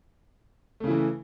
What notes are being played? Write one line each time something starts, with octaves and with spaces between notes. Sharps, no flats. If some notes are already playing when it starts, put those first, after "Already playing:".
C#3 E3 A3 E4